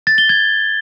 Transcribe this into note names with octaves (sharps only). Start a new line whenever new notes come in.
A6
G7
G#6